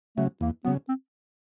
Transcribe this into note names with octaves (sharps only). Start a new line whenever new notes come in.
C#3 F#3 A3
E2 A#3
C#3 F#3 B3
C4